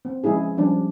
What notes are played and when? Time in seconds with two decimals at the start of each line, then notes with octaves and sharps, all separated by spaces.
0.05 C4
0.24 F3 G#3 C#4 E4 G#4
0.57 F3 G3 C#4 D4